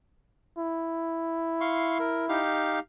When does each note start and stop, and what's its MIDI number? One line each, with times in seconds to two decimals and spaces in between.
0.58 2.40 64
1.61 1.98 77
1.61 1.98 84
1.61 1.98 85
1.99 2.26 70
2.29 2.79 63
2.29 2.79 67
2.29 2.79 77